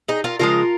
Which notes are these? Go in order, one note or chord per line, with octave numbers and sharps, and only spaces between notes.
D#4 G#4
F4 A#4
C#3 F3 G#3 F4 A#4